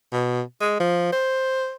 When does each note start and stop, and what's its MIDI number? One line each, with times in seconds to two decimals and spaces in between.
0.12 0.41 47
0.61 0.76 56
0.80 1.09 53
1.13 1.75 72